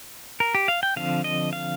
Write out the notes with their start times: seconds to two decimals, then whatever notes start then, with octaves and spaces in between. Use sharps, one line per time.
0.40 A#4
0.55 G4
0.68 F5
0.83 G5
0.96 D3 F3 C4 F5
1.24 D#5
1.53 F5